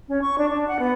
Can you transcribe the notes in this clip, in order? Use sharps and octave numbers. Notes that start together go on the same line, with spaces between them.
C#4
C#6
D4
D4
F#5
B3